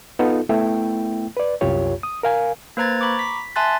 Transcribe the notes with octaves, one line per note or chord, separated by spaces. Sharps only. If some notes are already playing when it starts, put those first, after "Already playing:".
B3 D#4 F4 A4
A3 B3 E4 G5
B4 D5
C2 F#2 F4 G4 C#5
D#6
A#4 F5 G#5
A#3 B4 C5 A#5 G#6 A6
A#5 B5 C#6 D6
B6
E5 G#5 A5 C6 F#6 A6